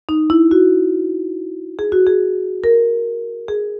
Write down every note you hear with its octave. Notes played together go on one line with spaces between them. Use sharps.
D#4
E4
F#4
G#4
F#4
G#4
A#4
G#4